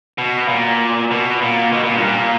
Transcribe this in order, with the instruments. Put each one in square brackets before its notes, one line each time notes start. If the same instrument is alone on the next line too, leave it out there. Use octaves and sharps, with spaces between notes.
[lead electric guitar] B2
A#2
B2
A#2
B2
A#2
G2
A#2